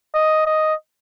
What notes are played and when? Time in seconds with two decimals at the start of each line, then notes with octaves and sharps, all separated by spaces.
0.14 D#5
0.46 D#5